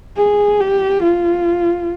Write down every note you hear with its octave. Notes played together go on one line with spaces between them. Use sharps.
G#4
G4
F4